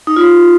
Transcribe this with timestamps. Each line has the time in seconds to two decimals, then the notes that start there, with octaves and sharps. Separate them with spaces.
0.07 D#4
0.16 F4